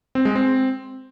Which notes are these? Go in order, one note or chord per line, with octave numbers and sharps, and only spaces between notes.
C4
G#3
C4